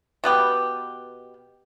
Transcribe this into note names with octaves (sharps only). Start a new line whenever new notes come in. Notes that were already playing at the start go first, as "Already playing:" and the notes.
B2 B3 G4